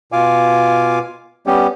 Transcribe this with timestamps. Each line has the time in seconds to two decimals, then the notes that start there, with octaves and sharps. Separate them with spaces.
0.12 B2 F4 F5 G#5 D6
1.47 G3 B3 C#4 G4